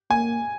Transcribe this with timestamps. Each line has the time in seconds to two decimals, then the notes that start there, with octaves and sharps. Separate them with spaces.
0.10 A#3 G#5